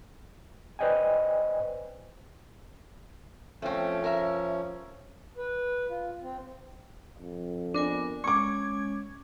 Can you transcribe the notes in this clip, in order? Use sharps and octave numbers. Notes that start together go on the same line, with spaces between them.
B4 C5 D5 D#5 G5 G#5
F3 A3 C4 C#4
A#4 E5
B4
F4
C4
F2
B3 D4 A#4 G#5
G#3 C#4 C#6 D6 G#6